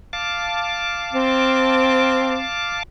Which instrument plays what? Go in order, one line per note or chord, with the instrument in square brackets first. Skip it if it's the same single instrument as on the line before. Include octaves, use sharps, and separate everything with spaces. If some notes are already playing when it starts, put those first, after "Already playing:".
[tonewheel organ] F5 A5 D6
[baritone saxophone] C4